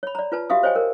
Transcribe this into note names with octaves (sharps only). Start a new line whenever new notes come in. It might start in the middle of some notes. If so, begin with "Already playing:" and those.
C#5 B5
D5 A#5
F4 B4 A5
F#4 G4 E5 F5 D#6
C5 C#5 D#5 G5 G#5
A#4